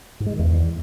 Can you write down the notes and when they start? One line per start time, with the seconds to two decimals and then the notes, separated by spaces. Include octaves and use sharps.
0.20 G#2
0.26 G#3
0.33 D#3
0.39 E2